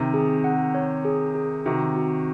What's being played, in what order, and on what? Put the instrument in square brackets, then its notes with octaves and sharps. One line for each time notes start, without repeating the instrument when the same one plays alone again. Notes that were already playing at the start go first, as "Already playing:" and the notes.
Already playing: [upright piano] C3 D#3
[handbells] G#4
F#5
C#5
G#4
G#4
[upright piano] C3 D#3 [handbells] F#4
[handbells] F#4